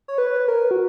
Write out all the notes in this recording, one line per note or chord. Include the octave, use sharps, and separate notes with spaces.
C#5
B4
A#4
F#4